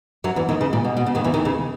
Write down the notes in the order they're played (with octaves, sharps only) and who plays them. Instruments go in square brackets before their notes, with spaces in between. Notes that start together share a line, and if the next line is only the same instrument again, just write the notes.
[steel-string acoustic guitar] F#2 F#3
E2 E3
D#2 D#3
C#3
A#2
B2
B2
C#3
D#2 D#3
E2 E3
D#2 D#3
C#3